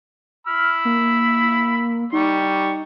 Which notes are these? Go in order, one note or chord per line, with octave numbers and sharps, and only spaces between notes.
B5 E6 F6
A#3
G3 D#4 C#6